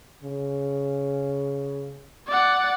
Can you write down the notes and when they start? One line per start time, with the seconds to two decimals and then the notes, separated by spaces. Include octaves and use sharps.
0.23 C#3
2.27 D5 F#5